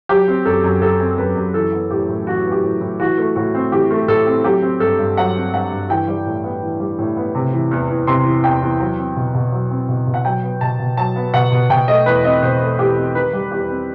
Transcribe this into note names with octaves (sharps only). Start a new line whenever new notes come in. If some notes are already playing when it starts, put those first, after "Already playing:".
F#3 G4
C4
F#2 A4
F#2
F#3 A4
C4
F#2 B4
F#2
E3 A4
B3
A2 G4
A2
E3 F#4
B3
G4
A2
A2
E3 F#4
A3
A2 F#4
C4
E3 G4
A3
A2 A4
C4
F#3 G4
C4
G2 A4
G2
F#3 F#5
C4
G2 F#5
G2
E3 G5
G3
A2
B3
E3
G3
A2
B3
C3
E3
E2
E2
C3 C6
E3
E2 G5
E2
F#3
C4
B2
B2
F#3
C4
B2
B2
F#5
F#3 G5
B3
B2 A5
B2
F#3 A5
B3
B2 F#5
B2
B2 G5
A3 D#5
E2 B4
C4 D#5
B2 C5
A3
E2 G4
C4
D#3 B4
G3
E2 G4
C4